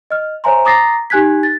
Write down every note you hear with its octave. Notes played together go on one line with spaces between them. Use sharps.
D#5 F6
C5 C#5 E5 G#5 A#5 C6
A#5 D6 D#6 A6 A#6 C7
D#4 G4 G#5 F#6 G#6 B6
A6